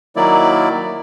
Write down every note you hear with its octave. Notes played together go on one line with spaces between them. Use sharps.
D#3 F#3 A#3 E4 D5